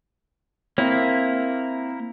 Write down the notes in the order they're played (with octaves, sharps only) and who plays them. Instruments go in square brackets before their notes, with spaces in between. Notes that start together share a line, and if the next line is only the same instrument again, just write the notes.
[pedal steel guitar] A#3 E4 [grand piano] C4